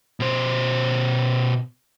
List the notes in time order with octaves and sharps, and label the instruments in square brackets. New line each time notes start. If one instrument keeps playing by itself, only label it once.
[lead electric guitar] B2 C5